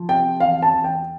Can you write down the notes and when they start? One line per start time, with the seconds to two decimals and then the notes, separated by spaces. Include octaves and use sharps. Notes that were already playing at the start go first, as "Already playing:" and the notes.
Already playing: F3
0.08 C3 G5
0.40 E2 F5
0.62 A5
0.73 E2
0.84 G5